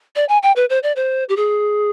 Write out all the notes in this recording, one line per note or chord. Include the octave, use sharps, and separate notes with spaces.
D5
G#5
G5
B4
C5
D5
C5
G4
G#4